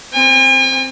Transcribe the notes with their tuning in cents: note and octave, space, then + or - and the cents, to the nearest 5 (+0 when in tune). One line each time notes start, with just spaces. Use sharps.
C4 +0 G#5 -45